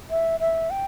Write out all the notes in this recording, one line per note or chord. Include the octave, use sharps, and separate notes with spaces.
E5
E5
G5